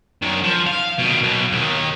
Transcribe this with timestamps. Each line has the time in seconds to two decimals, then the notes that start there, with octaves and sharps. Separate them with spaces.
0.22 F#2 D#3
0.43 F3
0.67 F5
0.99 B2 D#3
1.23 B1 B2
1.52 D#2 D#3